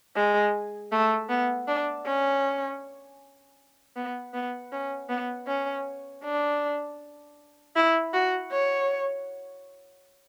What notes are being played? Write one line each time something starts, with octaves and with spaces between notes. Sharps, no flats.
G#3
A3
B3
D4
C#4
B3
B3
C#4
B3
C#4
D4
E4
F#4
C#5